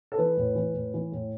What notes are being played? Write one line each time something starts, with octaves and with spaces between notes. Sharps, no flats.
A4
E3 B4
A2
E3
A2
E3
A2